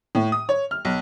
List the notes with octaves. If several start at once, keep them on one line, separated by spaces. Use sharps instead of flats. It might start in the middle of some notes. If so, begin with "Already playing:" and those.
A2
D#6
C#5
F6
B1